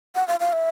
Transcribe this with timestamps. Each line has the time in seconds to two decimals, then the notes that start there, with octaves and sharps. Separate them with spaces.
0.15 F#5
0.28 F5
0.40 F5
0.53 E5